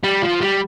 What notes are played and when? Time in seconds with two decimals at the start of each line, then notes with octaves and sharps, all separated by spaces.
0.04 G3
0.23 F3
0.41 G3